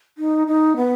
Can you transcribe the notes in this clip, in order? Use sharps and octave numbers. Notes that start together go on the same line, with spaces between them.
D#4
D#4
B3